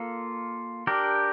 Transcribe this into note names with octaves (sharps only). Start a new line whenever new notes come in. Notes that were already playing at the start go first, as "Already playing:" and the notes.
Already playing: A#3 F4 A4
D4 G4 A#4